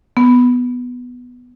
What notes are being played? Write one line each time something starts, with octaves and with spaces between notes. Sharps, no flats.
B3